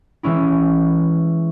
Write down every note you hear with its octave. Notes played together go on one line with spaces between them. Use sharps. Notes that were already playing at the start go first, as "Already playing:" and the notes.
E3 G#3 C#4 E4